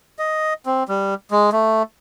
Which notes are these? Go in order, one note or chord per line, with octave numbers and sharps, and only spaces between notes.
D#5
C4
G3
G#3
A3